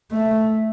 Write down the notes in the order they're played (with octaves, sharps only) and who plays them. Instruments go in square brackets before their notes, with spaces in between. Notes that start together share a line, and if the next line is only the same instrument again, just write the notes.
[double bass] A3